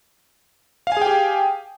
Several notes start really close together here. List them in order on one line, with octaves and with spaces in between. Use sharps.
F5 G#5 G#4 G5 G4